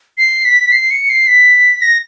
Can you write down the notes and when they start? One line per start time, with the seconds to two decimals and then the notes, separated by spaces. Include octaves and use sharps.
0.18 C7
0.45 B6
0.72 C7
0.91 C#7
1.09 C7
1.27 B6
1.82 A#6